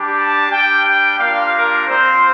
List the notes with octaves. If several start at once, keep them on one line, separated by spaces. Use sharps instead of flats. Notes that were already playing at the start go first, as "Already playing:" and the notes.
Already playing: G3 D4 G4
A5
G3 D4 G4 G5
G5
G3 A#3 D4 F4 F5
A#4
C4 F4 C5